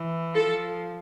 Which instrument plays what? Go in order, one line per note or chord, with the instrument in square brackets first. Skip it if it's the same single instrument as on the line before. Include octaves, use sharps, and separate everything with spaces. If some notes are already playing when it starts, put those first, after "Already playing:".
Already playing: [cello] E3
[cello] F3 [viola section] A4